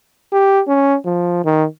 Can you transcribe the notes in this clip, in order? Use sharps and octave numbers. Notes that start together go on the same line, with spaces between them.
G4
C#4
F3
D#3